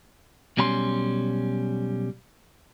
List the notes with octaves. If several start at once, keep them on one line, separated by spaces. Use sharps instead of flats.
B1 B2 G3 C#4 A#5 C6